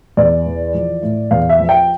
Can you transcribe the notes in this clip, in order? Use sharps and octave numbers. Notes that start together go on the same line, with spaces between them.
E2 D5
E3
F3
A2
E2 F5
E5
F3
G5